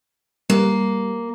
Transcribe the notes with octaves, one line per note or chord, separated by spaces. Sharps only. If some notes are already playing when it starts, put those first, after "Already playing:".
G3 A#3